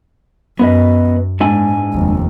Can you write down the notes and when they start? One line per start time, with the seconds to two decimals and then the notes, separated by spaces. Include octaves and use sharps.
0.59 F#2 B3 B4 D#5
1.40 G#2 G#3 D4 G#5
1.93 F1 D#2